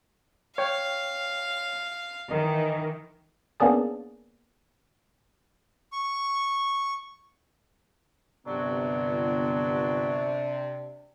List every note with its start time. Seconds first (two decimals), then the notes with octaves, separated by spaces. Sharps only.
0.58 C#5 F5 G5
2.31 D#3 E3 D#5
3.60 A#3 B3 C#4 D4 G#4 A5
5.92 C#6
8.47 G1 C3 F#3 B3 D4